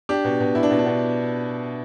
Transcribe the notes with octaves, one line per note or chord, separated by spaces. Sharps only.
D4 G4
B2
B2
B2 E4
D4
B2
D4
B2